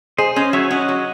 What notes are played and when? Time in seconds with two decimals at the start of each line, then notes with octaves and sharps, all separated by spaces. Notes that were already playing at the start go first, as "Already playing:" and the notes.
0.18 G#4 C5 D#5
0.36 C#4 C5 D#5
0.53 F#3 C#5 E5
0.71 C#4 D#5 F#5
0.88 F#3